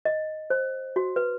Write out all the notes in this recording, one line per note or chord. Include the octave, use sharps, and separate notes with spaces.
D#5
C5
F#4
B4